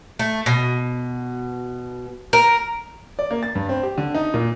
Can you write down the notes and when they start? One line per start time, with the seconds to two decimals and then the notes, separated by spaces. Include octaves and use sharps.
0.19 A3
0.46 B2
2.33 A#4
3.19 D5
3.31 A#3
3.43 A6
3.55 G2
3.69 C4
3.83 G4
3.98 D3
4.15 D#4
4.34 A#2